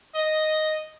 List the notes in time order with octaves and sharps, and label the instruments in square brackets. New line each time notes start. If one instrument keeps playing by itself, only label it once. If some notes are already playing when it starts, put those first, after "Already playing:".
[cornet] D#5